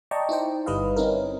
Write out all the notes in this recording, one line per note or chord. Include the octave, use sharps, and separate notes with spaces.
D5 D#5 G5 A5 A#5 C#6
D#4 E4 C5 G5
G1 G3 B4 D#5 F5
C4 C#4 D#4 E4 A#4